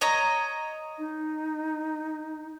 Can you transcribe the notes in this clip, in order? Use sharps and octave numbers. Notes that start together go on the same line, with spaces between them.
C#5 D#5 A#5
D#4